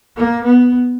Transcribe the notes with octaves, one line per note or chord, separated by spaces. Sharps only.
A#3
B3